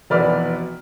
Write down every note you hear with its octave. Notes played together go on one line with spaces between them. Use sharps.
F1 B2 E3 D5 B5 F6